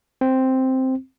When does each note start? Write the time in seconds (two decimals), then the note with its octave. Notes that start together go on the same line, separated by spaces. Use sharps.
0.21 C4